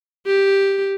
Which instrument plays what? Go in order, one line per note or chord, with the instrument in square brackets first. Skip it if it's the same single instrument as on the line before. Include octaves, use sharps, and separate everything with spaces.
[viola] G4